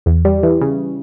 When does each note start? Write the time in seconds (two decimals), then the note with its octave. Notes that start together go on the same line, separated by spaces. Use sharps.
0.06 E2
0.25 G3
0.43 E3
0.61 C#3